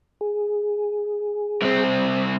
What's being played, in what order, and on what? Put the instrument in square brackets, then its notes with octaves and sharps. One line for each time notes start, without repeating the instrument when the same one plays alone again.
[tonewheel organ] G#4
[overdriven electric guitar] C2 C4